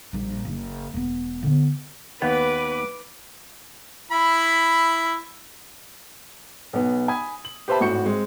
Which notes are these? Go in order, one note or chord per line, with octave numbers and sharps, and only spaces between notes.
A#1 G3
F#1
E1 B3
D3 B3
D#2 B3 B4 D6
E4 B5
B1 B3
G#5 B5 D#6 G#6
F#7
G4 B4 C5 E5 A5 B5
G#1 A2 F#4 C#6 G6 C#7
G#3 C4